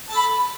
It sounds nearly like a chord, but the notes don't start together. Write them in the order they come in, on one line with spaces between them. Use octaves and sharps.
A5 A4 B5